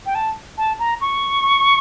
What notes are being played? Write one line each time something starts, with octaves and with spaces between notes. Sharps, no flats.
G5
A5
A5
A#5
C#6